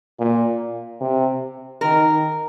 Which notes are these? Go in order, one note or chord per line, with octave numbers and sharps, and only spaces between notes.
A#2
C3
D#3 A#4